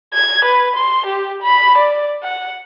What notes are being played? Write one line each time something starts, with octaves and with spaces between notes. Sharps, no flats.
G#6
B4
C6
G4
B5
D5
F#5